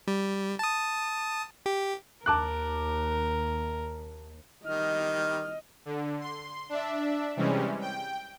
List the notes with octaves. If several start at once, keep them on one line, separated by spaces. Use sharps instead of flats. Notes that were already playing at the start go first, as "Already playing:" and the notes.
G3
A5 D#6
G4
D#2 A#4 A5 D6 F#6
D#3 G3 D#5 F6
D3
C6
D4 E5
C3 E3 G3 G#3 C#4
G5